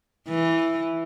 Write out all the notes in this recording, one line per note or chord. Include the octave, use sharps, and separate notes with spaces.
E3